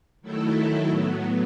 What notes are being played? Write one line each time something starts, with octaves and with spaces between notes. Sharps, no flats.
D#3 F#3 A3 E4 A4
A2 F#3 B3